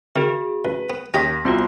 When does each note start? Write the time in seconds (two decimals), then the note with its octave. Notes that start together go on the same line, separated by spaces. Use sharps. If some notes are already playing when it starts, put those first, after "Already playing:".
0.16 D#3 C4 F#4 G#4
0.65 A1 B4
0.90 B3
1.14 D#2 C#4 G4 D#5 A#6 B6
1.45 C2 B3 C4 F4 F#4 C6